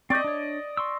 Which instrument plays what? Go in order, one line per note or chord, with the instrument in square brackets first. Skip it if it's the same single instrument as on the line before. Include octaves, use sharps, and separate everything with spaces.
[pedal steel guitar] C4 C#6 G6 [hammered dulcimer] D5 D#5
[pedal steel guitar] D4 C#5
C6 C#6 E6